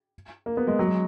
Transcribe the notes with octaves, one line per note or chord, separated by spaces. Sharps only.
A#3
B3
G#3
F#3
G#3